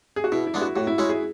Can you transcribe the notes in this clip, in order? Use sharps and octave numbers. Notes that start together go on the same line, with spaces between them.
G#4
F#4
B2 E4
E4
G#3 B3 D4
F#4
A2 F#4
E4
G#3 C#4 E4 F#4
G#4